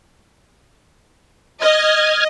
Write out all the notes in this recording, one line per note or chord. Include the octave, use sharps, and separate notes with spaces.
D#5 F6 G#6